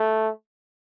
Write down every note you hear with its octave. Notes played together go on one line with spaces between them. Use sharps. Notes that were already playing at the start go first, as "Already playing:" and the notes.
Already playing: A3